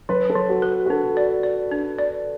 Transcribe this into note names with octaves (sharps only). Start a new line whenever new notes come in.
F#3 B4
A4
F#3
F#4
B4
F#4
D4 A4
D5
D5
D4
D5